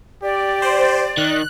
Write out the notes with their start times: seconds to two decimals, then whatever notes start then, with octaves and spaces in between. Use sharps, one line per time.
0.23 G4 D5
0.62 C5
1.17 D#3 F#6